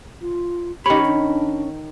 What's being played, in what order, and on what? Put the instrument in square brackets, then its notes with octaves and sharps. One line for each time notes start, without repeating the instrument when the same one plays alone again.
[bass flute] F4
[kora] D#3 C#5 [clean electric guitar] C#4 B5 [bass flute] G4
[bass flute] D4